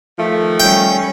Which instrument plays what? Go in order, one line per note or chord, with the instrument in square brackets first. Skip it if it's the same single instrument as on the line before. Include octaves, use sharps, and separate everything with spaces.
[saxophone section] D#3 F3 A3
[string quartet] G3 C#4 [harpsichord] G5